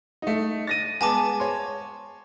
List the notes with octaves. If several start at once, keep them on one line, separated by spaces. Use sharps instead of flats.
A3 D#4
A6 A#6 D#7
G#3 B3 G#5 A5 D6
C#5 C6